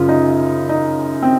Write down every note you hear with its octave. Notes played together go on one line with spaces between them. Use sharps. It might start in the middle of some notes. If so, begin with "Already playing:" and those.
Already playing: F#2 C#3 F4
D#4
D#4
C4